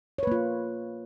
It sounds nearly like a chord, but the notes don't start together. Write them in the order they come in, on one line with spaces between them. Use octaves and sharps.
C#5 B4 A#3 F4